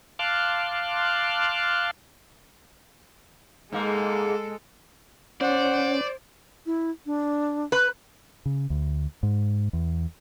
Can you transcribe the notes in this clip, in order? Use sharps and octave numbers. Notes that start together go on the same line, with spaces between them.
F5 A5 C6 D6 F6 F#6
G#2 G#3 A#3 A4
C#4 C5 D5 F#5
E4
D4
B4
C#3
D2
G#2
E2